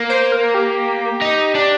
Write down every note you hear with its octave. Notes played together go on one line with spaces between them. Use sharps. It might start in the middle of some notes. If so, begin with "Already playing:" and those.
Already playing: A#3
C5
A#4
G4
D#4
D4